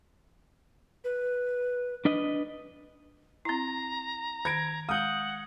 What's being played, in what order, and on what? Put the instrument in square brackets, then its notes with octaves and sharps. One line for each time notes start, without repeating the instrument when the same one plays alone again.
[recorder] B4
[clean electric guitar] D4 B4 D#5
[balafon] C4 E4 [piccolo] A#5
[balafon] D#3 [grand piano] G#6 A#6 D7
[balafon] G#3 [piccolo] F#5 [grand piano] D#6 G6